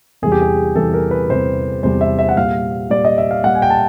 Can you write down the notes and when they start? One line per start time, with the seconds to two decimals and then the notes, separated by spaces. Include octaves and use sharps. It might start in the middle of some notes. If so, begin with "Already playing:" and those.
0.22 E2 C3 E3 G3 G#4
0.32 G4
0.42 G#4
0.75 E2 C3 E3 G3 A4
0.94 A#4
1.11 B4
1.29 E2 C3 E3 G3 C5
1.83 E2 C3 E3 G3 C5
2.01 E5
2.19 E5
2.29 F#5
2.37 A#2 G3 F5
2.90 A#2 G3 D5
3.05 D#5
3.18 E5
3.31 F5
3.44 A#2 G3 F#5
3.55 G#5
3.62 G5
3.70 A5